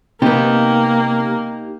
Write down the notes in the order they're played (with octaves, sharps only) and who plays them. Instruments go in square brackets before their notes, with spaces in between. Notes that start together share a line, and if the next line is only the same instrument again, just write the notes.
[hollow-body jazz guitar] C3 B3 [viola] A#3 [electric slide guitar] D#4 G4